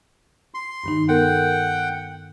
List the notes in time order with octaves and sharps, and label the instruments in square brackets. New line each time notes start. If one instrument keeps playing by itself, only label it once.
[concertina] C6
[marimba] G2 D#3 D#4
[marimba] B3 A4 A#4 [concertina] F#5 G5